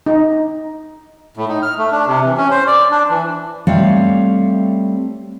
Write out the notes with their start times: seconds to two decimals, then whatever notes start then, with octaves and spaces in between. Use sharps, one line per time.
0.06 D#4
1.37 A2
1.48 D#4
1.63 F6
1.78 A3
1.92 D4
2.07 C3
2.25 E3
2.38 C#4
2.51 C5
2.67 D5
2.91 D4
3.10 E3
3.67 G3 A3 C4 C#5 F5